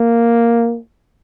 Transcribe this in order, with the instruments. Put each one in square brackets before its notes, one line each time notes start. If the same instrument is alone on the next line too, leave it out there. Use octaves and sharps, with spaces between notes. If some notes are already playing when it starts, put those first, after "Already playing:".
Already playing: [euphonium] A#3